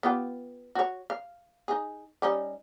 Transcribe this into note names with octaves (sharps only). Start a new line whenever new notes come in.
B3 F4 G4
F#4 C#5
F5
D#4 G#4
G3 C#4 D#4